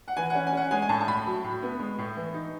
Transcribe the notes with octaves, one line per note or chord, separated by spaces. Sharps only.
F#5
E3 G#5
F#5
C#4
G#5
C#4 F#5
G#3 G#5
G#5
A2 A5
A5
A2 B5
F#3
A2
B3
G#3
A2
E3
D#4